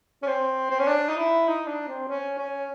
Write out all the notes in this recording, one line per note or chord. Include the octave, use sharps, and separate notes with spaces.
C#4
C4
C4
C#4
D4
D#4
E4
D#4
D4
C4
C#4
C#4